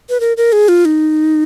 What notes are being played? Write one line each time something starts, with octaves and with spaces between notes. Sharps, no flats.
B4
A#4
A#4
G#4
F4
D#4